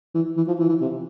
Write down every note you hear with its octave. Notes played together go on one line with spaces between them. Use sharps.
E3
E3
F3
E3
E3
C3